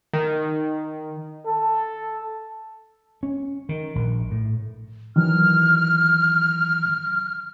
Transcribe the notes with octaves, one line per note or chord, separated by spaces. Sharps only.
D#3
A4
C#4
D#3
A#1
A2
D#3 E3 F#3 F6